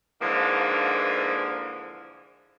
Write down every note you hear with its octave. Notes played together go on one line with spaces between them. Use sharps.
G#2 D3 E3 F3 A#3